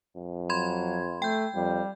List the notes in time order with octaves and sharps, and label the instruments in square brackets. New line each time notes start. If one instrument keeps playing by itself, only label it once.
[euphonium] F2
[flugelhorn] F#3 [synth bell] B5 C6 G#6
[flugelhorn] A3 [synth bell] G5 G6
[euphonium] F2 [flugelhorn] G3